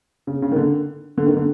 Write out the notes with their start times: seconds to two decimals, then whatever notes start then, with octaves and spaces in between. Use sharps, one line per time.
0.27 C#3
0.42 C#3
0.52 D#3
0.56 D3
1.17 D3
1.26 D#3
1.37 D3